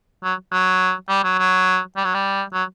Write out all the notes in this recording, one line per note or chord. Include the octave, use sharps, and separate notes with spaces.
F#3
F#3
G3
F#3
F#3
G3
F#3
G3
F#3